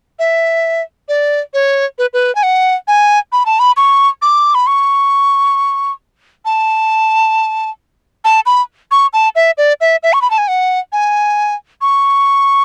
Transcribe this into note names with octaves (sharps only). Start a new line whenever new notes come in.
E5
D5
C#5
B4
B4
G#5
F#5
G#5
B5
A5
B5
C#6
D6
B5
C#6
A5
A5
B5
C#6
A5
E5
D5
E5
E5
C#6
B5
A5
G#5
F#5
G#5
C#6